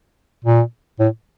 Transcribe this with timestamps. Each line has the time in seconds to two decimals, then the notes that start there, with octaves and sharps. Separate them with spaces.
0.45 A#2
1.00 A2